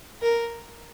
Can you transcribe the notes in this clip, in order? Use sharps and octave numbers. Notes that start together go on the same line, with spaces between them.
A#4